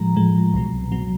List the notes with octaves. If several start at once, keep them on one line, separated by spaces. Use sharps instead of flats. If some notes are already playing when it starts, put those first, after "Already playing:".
Already playing: A2 F3 G#3 A#5
A2 F3 G#3
C2 B2 F#3
B2 F#3